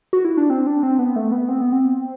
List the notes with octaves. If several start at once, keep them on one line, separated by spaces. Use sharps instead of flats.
F#4
E4
D4
C4
D4
C4
B3
A3
B3
C4
B3
C4